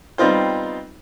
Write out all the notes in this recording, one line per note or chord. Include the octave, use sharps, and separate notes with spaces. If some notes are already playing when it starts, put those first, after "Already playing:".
G3 B3 C4 D#4 F4 C5